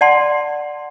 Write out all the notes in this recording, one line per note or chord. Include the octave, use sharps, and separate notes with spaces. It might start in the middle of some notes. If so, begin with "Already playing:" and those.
D5 F#5 A5 C6